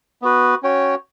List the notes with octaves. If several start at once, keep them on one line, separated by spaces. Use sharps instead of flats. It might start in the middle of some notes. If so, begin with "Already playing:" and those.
B3 F#4 B4
C#4 F#4 C#5 G5